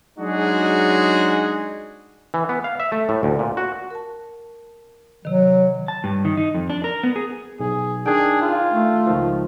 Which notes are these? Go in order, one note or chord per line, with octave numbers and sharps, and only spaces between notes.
F#3 G#3 D4 D#4 F#4 G#4
E3
B3
F5
E5
A3
A2
D2
A#2
F#4
A#4 A5
C3 D#3 F#3
A5
G2
D#3
D#4
F2
D4
A#4
B3
G#4
B1 G#4
D#3 D4 G#4 G5
F4
A3
C#2 D#3 F3